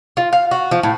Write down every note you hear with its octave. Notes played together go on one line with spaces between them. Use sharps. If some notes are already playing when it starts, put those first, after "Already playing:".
F4
F5
F#4
F3
A2